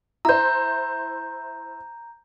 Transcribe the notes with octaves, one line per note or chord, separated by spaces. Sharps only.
E4 C5 A#5 G6